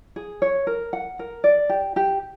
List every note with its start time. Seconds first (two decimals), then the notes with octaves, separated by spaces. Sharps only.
0.16 G#4
0.42 C#5
0.67 A#4
0.93 F#5
1.19 A#4
1.44 D5
1.69 G4
1.96 G4